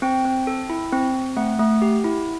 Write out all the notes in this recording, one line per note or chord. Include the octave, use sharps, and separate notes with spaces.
C4 G5
C4
A4
E4
C4
C4
A3 F#5
A3
G4
E4